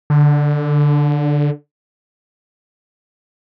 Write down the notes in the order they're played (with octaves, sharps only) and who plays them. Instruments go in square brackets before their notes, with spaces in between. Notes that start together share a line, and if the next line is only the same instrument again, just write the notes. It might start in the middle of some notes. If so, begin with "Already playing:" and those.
[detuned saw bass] D3